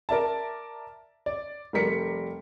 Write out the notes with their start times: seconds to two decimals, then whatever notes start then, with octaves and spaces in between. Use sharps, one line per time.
0.09 A#4 D5 E5 A5
1.26 D5
1.73 F1 G3 A#4 B6 C#7